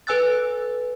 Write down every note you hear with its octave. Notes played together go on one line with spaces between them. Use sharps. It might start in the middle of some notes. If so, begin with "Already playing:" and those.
A4 B4 G#5 E6 F#6 A6